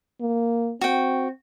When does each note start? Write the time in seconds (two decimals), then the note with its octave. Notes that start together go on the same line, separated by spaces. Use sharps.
0.21 A#3
0.81 C4 F#4 G5